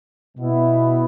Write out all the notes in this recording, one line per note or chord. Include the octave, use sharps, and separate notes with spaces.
B2 B3 E4